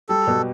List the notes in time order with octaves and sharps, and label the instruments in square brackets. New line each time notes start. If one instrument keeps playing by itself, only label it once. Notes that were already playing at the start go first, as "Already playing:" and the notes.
[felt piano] G3 [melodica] A4
[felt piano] B2